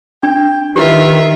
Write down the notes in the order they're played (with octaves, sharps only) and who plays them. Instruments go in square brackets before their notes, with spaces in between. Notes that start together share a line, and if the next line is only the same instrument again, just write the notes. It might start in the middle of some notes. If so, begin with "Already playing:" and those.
[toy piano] D4 [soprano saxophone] G5
[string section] D#3 [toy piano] E4 G4 [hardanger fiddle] F4 E5 [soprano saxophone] B4